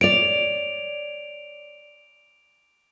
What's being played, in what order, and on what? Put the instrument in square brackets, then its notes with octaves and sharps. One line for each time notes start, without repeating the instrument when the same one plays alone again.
[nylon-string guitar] C#5 D5 [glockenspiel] D7 F7